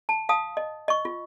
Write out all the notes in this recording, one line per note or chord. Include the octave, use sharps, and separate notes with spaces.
A5
F5 A5 D#6
D#5
D#5 C#6
F4